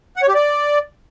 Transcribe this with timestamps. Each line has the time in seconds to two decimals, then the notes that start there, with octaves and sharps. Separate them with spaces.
0.16 F#5
0.23 C#5
0.29 G4
0.35 D5